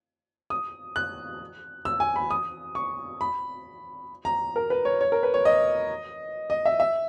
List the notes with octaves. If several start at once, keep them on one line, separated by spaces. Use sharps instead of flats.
D#6
F#6
E6
G#5
B5
D#6
C#6
B5
A#5
A#4
B4
C#5
C#5
A#4
B4
C#5
D#5
D#5
E5
E5